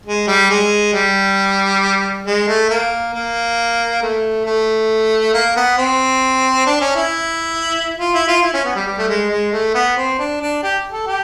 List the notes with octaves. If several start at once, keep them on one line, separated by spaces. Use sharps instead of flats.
G#3
G3
G#3
G3
G#3
A3
A#3
A#3
A3
A3
A#3
B3
C4
D4
C#4
E4
F4
E4
F4
E4
C#4
B3
G3
G3
A3
G#3
G#3
A3
B3
C4
D4
D4
G4
A4
G4